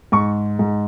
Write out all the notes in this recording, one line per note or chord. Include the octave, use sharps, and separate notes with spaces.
G#2 C#6
G#2